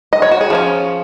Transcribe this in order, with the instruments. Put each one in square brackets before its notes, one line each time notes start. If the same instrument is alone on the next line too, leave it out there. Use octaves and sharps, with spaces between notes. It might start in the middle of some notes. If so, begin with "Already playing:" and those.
[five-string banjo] D#5
C#5
F#4
G#4
F3 A#3 C#4